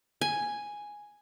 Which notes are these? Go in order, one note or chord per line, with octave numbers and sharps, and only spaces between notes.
G#5